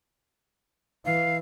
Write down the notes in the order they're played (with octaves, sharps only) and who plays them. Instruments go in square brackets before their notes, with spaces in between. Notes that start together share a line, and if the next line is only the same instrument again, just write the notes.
[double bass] E3 [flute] F5